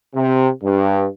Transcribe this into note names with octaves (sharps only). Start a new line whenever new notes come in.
C3
G2